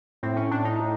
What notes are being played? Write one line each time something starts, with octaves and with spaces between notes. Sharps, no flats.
A2 C4
C#4
A2 D4
D#4
A2